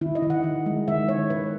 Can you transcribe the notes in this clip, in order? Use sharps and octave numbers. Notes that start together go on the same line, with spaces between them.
D#3 E4
D#5
D#3
F#5
D#3
G#3
D#3 E5
D#3 C#5
D#3 B4